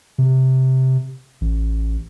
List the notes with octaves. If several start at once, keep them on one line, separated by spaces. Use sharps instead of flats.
C3
A1